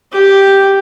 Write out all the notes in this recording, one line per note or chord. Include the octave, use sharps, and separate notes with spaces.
G4